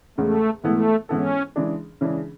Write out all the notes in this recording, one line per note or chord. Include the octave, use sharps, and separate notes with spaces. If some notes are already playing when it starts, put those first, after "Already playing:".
E2 C#3 G#3 A3
G#2 E3 A3 B3 E4 A4
G#2 E3 B3 C#4 E4 A4
C#3 E3 G#3 D4 G#4
C#3 E3 G#3 D4 G#4